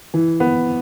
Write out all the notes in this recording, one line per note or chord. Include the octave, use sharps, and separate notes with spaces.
E3
B3